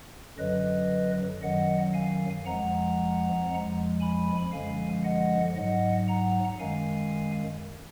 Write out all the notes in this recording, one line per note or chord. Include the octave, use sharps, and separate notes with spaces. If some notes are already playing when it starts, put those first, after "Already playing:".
F#2 D3 F#3 B4 D#5
F#2 D#3 F#3 D#5 F#5
F5 G#5
F2 F3 G#3 F#5 A#5
F2 F3 G#3
G#5 B5
F#2 D3 F3 G#3 F5 G#5
D#5 F#5
G#2 F#3 D#5 F#5
F#5 A#5
F#2 D#3 G#3 F5 G#5